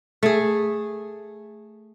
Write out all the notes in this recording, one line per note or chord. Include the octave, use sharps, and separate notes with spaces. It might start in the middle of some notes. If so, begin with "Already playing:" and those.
A3 G#4